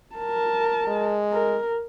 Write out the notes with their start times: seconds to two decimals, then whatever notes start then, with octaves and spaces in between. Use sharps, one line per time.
0.15 A#4 A5
0.88 G#3
1.32 A#4